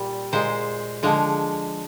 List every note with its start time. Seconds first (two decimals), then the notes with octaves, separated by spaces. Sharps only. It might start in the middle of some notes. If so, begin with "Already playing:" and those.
Already playing: A#2 G3
0.33 A#2 G#3 C5
1.03 D3 F3 G#3